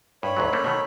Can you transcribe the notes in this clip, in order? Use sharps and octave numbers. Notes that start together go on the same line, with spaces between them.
G2 C#5 B5
D2 G#2 F#3
A3 A#3 C#4
B2 D#3 A3